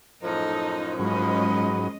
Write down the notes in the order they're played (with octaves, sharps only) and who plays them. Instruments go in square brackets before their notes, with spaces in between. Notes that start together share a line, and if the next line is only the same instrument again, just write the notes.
[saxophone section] F#2 A2 F3 [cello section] D#4 [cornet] A4
[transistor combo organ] G#2 F#3 [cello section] G#3 C#4 D#5 [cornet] B5